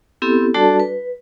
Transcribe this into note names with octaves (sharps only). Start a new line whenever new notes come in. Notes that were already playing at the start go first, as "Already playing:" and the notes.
B3 C4 E4 G4 A4
G3 D4 F#4 A4 D5 A5
B4